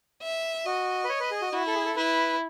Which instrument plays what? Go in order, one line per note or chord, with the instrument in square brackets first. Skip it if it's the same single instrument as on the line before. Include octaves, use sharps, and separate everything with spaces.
[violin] E5
[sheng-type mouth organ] F#4 [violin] D#5
[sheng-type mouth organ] B4
C#5
B4
G#4
F#4
[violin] E4 [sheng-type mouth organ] F#4
[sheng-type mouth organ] A4
G#4
A4
[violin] E4 [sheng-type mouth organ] B4